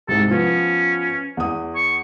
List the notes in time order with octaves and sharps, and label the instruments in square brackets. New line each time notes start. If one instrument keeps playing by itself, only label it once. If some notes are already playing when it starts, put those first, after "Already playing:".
[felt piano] C2 G#2 [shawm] A4
[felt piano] F3 B3 [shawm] C#4
[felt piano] E2 D#6
[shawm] C#6